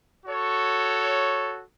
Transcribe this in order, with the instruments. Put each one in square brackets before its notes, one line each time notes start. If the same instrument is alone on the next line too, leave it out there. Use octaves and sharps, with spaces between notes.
[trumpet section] F#4 A4 C#5